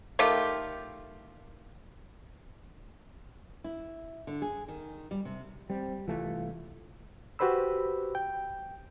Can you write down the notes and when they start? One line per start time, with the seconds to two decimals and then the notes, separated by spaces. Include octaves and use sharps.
0.19 D#3 A3 F4 G4
3.64 E4
4.27 D3
4.42 G#4
4.68 D#3
5.11 G3
5.25 C3
5.70 G3 C4
6.08 C2 E3 A3 F4
7.39 F#4 G4 B4 C5 B5 E6
8.15 G5